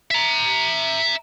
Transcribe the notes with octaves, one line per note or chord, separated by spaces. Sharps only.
E5 A#5